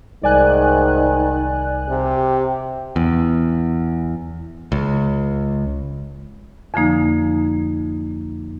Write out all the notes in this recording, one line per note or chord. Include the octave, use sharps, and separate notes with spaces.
C2 G#2 D#3 D5 G#5 F#6
C3 G4
E2
C#2
F2 D3 F3 A#3 D#4